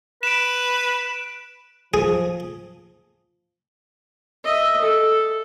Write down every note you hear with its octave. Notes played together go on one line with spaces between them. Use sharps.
B4 D7 E7
F3 G#4
D#5 E5
A4